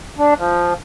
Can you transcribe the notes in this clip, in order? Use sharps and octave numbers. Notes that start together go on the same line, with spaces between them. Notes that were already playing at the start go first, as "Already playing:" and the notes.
D4
F3